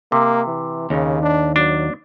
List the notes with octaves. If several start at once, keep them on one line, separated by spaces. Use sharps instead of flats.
C3 A#3
E3
D#2 C#3
D4
F#3 D4